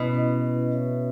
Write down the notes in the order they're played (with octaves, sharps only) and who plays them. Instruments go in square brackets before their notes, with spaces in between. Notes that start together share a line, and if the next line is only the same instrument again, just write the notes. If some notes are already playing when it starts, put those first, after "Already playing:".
Already playing: [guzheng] B2 [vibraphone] C#4 E4 B4 D#5
[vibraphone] C#4 E4 B4 D#5
C#4 F#4 C#5 E5